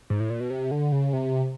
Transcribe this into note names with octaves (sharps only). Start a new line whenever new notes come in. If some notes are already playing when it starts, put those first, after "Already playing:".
G#2
A2
A#2
B2
C3
D3
C#3
C3